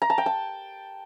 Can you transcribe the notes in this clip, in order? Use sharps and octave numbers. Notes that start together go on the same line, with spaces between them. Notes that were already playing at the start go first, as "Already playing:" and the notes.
A#5
A5
G5
A5